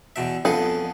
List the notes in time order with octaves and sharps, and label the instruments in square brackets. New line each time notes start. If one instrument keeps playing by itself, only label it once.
[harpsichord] E2 B2 E5
[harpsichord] F2 B3 G#4 [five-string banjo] A4